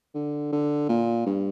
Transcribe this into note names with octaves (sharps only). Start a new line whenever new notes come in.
D3
D3
A#2
G2